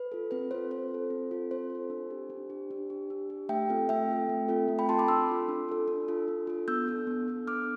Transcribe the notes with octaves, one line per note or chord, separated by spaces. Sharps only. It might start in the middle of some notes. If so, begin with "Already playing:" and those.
Already playing: B4
F4 A4
C4 B4
F4 A4 C5
C4 C5
F4 A4
C4
F4 A4
C4 C5
F4
A4
D4
G4
D4
G4
D4
G4
D4
G4
A3 E5 G5
C4 F4 A4
A3 E5 G5
C4 F4 A4
A3
C4 F4 A4
A3
G5 B5
C4 F4 A4 A5 C6
B5 D6
D4 C6 E6
F4 A4
D4
F4 A4
D4
F4 A4
D4
F4 A4
B3 E6 G6
D4 A4
B3
D4 A4
B3 D6 F6